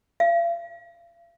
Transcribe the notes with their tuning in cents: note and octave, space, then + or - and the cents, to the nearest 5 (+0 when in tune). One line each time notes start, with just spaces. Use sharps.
F5 -40